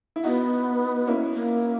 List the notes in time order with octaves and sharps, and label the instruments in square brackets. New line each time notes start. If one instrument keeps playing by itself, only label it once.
[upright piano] E4
[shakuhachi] B3 [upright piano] D#4 F#4
[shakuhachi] A#3 [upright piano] C#4 E4
[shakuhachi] A#3